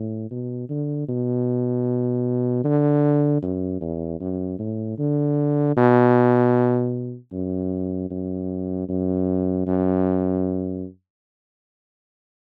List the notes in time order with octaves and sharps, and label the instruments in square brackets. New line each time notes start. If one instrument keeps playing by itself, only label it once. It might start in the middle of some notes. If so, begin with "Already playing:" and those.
Already playing: [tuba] A2
B2
D3
B2
D3
F#2
E2
F#2
A2
D3
B2
F#2
F#2
F#2
F#2